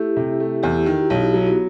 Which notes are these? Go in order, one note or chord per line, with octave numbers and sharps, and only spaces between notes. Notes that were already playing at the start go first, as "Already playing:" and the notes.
Already playing: A3 E4 G4
C3
A3
E2 E4 G4
D#3 G4
F#4
E4
B1 D#4 F#4
F#3
B3